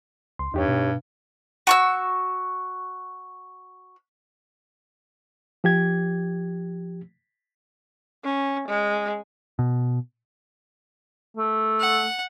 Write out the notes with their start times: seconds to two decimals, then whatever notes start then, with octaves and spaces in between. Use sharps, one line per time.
0.39 C#2 C6
0.54 E2 G2 D#4 G4 C#5
0.68 B2
1.67 F#4 C#6 E6
5.64 F3 G4 G#6
8.24 C#4
8.68 G#3
9.59 B2
11.37 A3
11.80 F#5